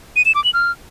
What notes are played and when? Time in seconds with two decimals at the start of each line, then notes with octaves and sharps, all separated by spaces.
0.16 D#7
0.25 E7
0.35 D6
0.44 F#7
0.54 F6